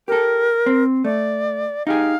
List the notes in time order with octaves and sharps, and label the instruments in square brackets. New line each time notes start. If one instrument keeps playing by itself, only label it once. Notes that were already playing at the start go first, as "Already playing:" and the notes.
[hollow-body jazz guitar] G4 A4 [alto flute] A#4
[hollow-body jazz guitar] C4
[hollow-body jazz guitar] A3 [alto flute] D5
[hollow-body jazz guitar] D#4 G4 G#4 [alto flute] F5